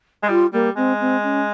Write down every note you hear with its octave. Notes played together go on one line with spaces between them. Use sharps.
G#3
G3 F4
G3 A#3
G#3 C4
C4
C#4